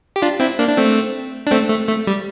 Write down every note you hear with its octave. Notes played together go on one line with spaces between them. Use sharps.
G4
D4 F4
C4 E4
A#3 D4
D4
A3 C4
D4
A3 C4
A3
A3
G3